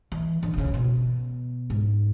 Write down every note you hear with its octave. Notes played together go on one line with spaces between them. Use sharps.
E3
D3
B2
C#3
B2
G#2